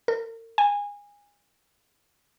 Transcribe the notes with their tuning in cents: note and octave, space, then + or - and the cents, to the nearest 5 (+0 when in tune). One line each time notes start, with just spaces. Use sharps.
A#4 -40
G#5 -25